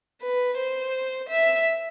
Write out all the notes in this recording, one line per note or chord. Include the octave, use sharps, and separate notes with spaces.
B4
C5
E5